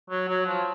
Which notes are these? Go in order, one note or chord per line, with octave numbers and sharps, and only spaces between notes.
F#3
F#3
F3